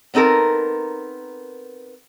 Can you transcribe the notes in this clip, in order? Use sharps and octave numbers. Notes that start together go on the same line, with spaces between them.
B3 C4 D#4 A4 A#4